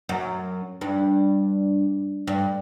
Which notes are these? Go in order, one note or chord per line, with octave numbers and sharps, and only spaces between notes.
F#2
G2
G2